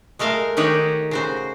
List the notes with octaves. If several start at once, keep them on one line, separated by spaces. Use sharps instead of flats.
G#3 A3 A#4 F5
D#3 D#4 G4 C#5 F#5
C#3 F#4 C5